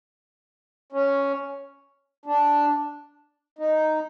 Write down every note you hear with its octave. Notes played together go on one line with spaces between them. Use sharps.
C#4
D4
D#4